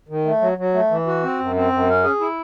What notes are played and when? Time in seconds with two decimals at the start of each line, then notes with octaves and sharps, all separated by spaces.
0.09 D#3
0.25 A3
0.41 F#3
0.58 F#3
0.74 A3
0.91 E3
1.07 F#4
1.23 C4
1.40 F#2
1.56 C4
1.72 F#2
1.89 C#4
2.04 G#4
2.20 E4